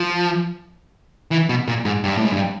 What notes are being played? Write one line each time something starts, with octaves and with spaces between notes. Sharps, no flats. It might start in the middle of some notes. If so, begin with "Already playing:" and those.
Already playing: F3
E3
B2
A#2
G#2
G2
A2
G#2
G2